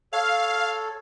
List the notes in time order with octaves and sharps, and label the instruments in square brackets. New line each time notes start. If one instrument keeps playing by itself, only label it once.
[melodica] A4 C#5 [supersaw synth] F5